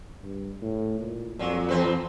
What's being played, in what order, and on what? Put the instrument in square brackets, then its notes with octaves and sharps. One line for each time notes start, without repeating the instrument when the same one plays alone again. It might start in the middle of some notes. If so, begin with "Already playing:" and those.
[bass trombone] G2
A2
A#2
[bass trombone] F2 [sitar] A#2 F#3
[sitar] E2 C4 B4